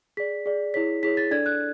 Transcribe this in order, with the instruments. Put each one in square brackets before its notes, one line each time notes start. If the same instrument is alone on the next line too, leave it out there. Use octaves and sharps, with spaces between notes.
[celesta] G#4 D5 B6
G#4 D5
E4 G#4 C#5 B6
E4 G#4 C#5 B6
A6
D4 A4 D5 G#6
F#6